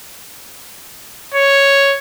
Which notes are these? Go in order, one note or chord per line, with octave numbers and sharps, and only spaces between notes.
C#5